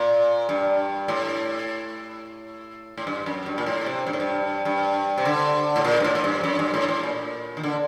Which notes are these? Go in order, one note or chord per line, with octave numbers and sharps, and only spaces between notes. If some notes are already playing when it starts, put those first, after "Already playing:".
Already playing: A#2
G2
A2
A2
G2
F#2
G2
A#2
A2
C3
G2
A2
G2
G2
C3
D3
A2
A#2
G2
A2
A2
G2
F#2
G2
A2
A2
A#2
D#3
D3